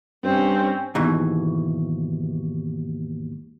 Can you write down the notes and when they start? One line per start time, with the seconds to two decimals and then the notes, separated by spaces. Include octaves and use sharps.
0.24 G2 C4 C#4
0.95 D#2 G#2 B2 E3